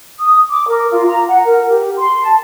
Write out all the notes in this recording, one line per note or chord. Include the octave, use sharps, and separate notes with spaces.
D#6
D6
A#4
F4
A#5
F#5
A#4
G4
C6
A5